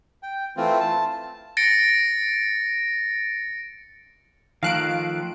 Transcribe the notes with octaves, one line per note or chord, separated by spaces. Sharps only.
G5
E3 A3 C4 F4
A5
A6 A#6 C#7 D7
D#3 F3 A3 F5 F#6 D7